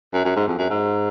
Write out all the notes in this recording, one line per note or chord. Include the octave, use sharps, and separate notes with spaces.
F#2
F#2
G#2
F2
F#2
G#2